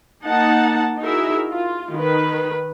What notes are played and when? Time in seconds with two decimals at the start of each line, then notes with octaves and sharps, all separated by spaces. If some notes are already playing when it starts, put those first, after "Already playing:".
0.25 A#3 D#4 F#5 A5
1.00 D#4 E4 F#4 G#4 A#4 E5
1.52 F4
1.97 D#3 B4